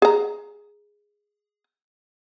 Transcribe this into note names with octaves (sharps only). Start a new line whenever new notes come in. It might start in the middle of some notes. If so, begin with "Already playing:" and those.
G#4 A#5